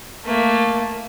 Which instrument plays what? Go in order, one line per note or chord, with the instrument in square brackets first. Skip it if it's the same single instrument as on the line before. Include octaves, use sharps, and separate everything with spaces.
[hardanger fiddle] A3 A#3